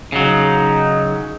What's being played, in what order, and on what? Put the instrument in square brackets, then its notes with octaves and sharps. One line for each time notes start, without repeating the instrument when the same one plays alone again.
[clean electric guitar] C#3 F#3 [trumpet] D#4